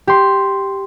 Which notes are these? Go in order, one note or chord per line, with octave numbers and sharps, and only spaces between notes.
G4 C6